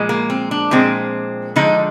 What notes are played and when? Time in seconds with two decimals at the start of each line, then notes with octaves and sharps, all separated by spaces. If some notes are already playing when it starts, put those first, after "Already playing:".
Already playing: A#2 F3 G#3
0.09 A#3
0.30 C4
0.51 D4
0.71 A#2 F3 G#3 C4
1.56 D3 F3 G#3 D#4